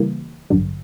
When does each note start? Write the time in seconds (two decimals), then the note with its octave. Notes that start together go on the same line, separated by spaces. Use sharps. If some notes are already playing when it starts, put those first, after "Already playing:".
Already playing: C#3 E3 G3 A#3
0.50 A1 G2 D3 F#3